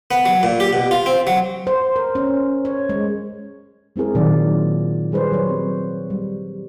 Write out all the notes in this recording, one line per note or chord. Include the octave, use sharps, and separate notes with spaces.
B3
F#3
A#2
G4
B2
F4
C4
F#3
C5
A#4
C#4
C#5
G#3
G#3 C4 E4 G#4 A#4
A#2 D#3 F#3 F4 D5
G3 G#4 B4 C5 D5
F#3 C5 C#5
C4
G3